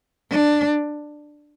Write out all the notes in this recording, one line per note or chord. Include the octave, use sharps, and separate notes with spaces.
D4